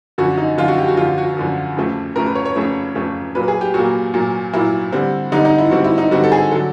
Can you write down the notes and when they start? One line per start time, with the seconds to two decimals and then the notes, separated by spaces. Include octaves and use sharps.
0.18 F#2 D3 F3 F#4
0.38 D#4
0.58 F#2 D3 F3 F4
0.68 F#4
0.78 G4
0.88 F#4
0.97 F#2 D3 F3 F4
1.18 F#4
1.37 F#2 D3 F3
1.77 F2 C#3 F3 A3
2.16 F2 C#3 F3 A3 A#4
2.26 B4
2.35 C#5
2.45 C#5
2.56 F2 C#3 F3 A3
2.95 F2 C#3 F3 A3
3.35 A#2 F#3 A#3 B4
3.48 G#4
3.61 G4
3.74 A#2 F#3 A#3 F#4
4.14 A#2 F#3 A#3
4.53 A#2 F#3 A#3 E4
4.92 D3 G3 C4
5.32 D3 G3 C4 D#4
5.45 D#4
5.58 E4
5.71 D3 G3 C4 F#4
5.84 E4
5.98 D#4
6.11 D3 G3 C4 F#4
6.24 A4
6.32 G#4
6.51 D3 F#3 A4